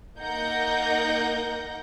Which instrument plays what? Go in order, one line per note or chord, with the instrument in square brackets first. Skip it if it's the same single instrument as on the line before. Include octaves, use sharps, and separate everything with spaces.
[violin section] A#3 D#4 A#4 F#5 G6 A#6